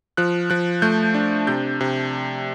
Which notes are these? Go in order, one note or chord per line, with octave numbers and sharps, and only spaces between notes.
F3 F#6
F3 F#6
A3 G6
D4
C3 G6
C3